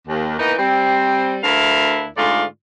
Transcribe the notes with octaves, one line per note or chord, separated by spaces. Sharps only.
D#2
E3 A#3 B3 D#4
G3 C4
D2 D4 E4 A#4 F5
G#2 D3 A3 F4 D5